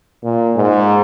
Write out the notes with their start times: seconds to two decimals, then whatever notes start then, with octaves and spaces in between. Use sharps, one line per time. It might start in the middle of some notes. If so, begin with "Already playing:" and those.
0.23 A#2
0.56 G#2